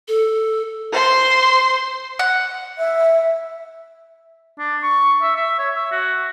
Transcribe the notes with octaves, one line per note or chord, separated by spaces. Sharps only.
A4
C5 C6
F#5
E5
D4
C#6
E5
E5
C#5
E5
F#4